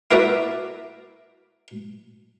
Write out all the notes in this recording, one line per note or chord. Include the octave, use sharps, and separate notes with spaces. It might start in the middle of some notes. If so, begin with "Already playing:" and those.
E4 F#4 A#4 B4 D5 E5